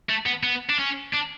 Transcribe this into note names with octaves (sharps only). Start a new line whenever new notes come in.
A3
B3
B3
D4
C#4
D4